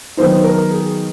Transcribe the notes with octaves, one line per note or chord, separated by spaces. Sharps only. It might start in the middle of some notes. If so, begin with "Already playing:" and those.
D#3 F#3 B3 D#4 C5
A#4
G#4